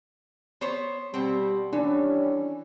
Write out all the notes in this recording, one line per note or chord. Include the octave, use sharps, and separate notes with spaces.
B3 C5 C#5
B2 G3 B3 C4
D#3 E3 G3 C#4 D4